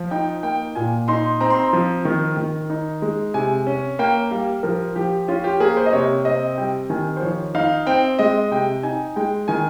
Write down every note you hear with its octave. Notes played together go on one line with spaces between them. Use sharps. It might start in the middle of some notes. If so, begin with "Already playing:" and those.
Already playing: F3
D#4 G5
A#3 G5
A#2 G#5
D#4 C6
C4 A#5
C6
A#5
F3
D#3
D#3
D#4
G#3
C3 G#5
C#4
A#3 G5
G3 F5
F3 A#4
F3 G4
C#4 F4
G4
A#3 G#4
C5
D#5
C3 C#5
C4 D#5
G3 G5
D#3 G#5
C5
F3 C#5
D#4 F5
C4 G5
G#3 D#5
C3 G5
D#4 G#5
G#3 G5
D#3 G#5